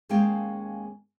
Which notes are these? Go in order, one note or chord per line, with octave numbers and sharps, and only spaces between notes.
D#2 G#3 A#3 C#4 F5 G5